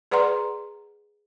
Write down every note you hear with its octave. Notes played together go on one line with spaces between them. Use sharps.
G#4 B4 D5 F#5 A#5 C6